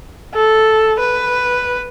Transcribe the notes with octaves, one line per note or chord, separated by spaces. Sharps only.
A4
B4